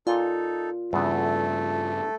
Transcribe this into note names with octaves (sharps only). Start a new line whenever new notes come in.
A#2 D#4 F4 A4
E2 G2 C#3 A3 B3 A4